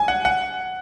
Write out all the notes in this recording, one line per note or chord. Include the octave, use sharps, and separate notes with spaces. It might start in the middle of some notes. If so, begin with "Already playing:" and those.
Already playing: G#5
F#5
F#5